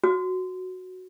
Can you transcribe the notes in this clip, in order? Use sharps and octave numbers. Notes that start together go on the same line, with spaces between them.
F#4